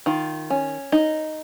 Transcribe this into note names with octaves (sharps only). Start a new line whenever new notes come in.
D#3 F4
C#4
D#4